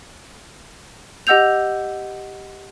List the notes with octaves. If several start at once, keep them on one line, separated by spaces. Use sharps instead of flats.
G4 D#5 F#5 E6 G6 F7